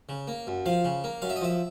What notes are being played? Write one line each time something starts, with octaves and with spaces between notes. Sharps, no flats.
C#3
A#3
F#2
F3 F5
C#3
A#3
F#2 F5
E5
D#5
F3 E5